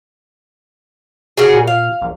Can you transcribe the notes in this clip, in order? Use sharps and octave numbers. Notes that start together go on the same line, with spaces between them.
C#3 F#4 G#4
A#2
F5
A#1